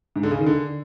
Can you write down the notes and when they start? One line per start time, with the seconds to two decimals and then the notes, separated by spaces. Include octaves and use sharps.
0.16 G#2
0.23 D3
0.31 C#3
0.39 D#3
0.46 D3